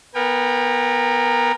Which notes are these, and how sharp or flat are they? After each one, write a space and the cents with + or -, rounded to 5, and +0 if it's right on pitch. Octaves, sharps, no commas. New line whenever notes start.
B3 -10 A#4 +0 G5 +40